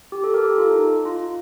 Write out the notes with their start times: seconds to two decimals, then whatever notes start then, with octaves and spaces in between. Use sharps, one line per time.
0.12 G4
0.24 A4
0.34 G4 A#4
0.46 G4
0.58 F4 A4
0.71 D#4
1.05 F4
1.24 F4